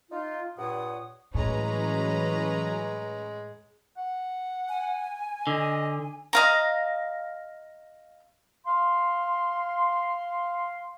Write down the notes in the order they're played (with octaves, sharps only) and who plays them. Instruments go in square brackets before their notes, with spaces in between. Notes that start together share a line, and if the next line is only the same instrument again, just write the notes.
[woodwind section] D#4 F4
G2 A#2 C#5 F#5 D#6
[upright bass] A2 [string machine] E3 F#3 [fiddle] G#3 [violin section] C#4 B4 A#5
[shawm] F#5
[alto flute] G#5
[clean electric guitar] D3 [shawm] D#5
[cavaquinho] D#5 F5 A#5
[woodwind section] F5 C6